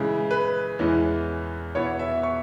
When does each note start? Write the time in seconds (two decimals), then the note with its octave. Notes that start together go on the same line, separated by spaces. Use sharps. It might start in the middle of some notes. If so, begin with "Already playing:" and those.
Already playing: C#3 E3 G#3 E4
0.31 B4
0.79 E2 E3 G#3 C#4 E4
1.75 E2 B2 B3 E4 C#5
1.99 E5
2.23 C#6